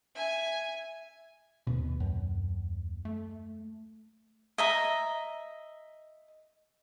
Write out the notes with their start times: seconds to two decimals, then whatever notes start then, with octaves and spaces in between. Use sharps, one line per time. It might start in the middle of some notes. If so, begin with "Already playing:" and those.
0.15 E5 G#5
1.67 D#2 B2 B3
2.00 F#2
3.05 A3
4.58 D#5 E5 A#5